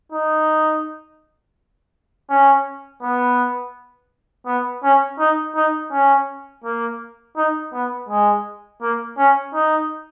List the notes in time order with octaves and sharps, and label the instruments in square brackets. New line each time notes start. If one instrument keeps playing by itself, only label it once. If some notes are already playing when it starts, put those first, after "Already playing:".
[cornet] D#4
C#4
B3
B3
C#4
D#4
D#4
C#4
A#3
D#4
B3
G#3
A#3
C#4
D#4